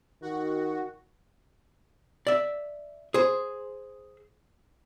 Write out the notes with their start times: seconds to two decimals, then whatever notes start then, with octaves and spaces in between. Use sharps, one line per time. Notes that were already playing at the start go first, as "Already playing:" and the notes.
0.22 D#3 F#4
2.27 D5 E5
3.14 G#4 C5